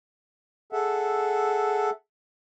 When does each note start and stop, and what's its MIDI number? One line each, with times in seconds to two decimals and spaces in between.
0.73 1.90 68
0.73 1.90 69
0.73 1.90 76
0.73 1.90 78